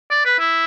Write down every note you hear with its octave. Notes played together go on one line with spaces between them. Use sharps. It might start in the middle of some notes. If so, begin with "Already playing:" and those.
D5
B4
E4